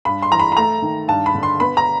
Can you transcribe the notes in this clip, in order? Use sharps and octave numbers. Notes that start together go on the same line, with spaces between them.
G2 B5
C6
E3 A#5
B5
B5
A3 A#5
D#3
G2 A5
B5
D3
C6
B3 B5
A#5